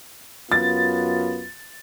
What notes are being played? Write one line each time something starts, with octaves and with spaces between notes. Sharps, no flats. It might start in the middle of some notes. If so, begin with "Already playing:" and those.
F#2 B3 F4 A6